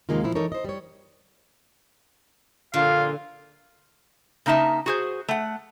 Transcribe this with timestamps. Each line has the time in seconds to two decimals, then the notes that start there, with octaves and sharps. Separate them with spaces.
0.09 D#2 C3 D#3 G#3 A#3 F4
0.24 A#2 F3 E4
0.35 E3 D#4 A4 A#4 C#5
0.52 C5 D#5
0.64 G3 C#5
2.74 A#1 A#2 D3 F4 F5
4.46 C#3 A#3 D#4 E5 A5
4.86 F#4 G#4 C5
5.29 A3 F#5